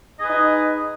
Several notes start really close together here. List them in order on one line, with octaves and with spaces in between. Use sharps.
D#5 G#4 B4 D#4